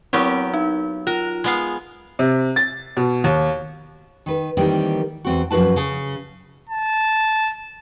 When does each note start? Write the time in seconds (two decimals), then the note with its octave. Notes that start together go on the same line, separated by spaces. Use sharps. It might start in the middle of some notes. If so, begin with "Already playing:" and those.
0.13 F#3 B3 C4 E4 G4 A#4
0.54 D#4
1.07 F4 A#4
1.44 G#3 B3 F5
2.19 C3
2.56 A6
2.97 B2
3.24 D#2
4.26 D#3 B4
4.57 D#3 E3 G3 A#3 C4
5.25 E2 C4 F#4
5.51 F#2 F3 F#4 B4 A5
5.76 C#3
6.69 A5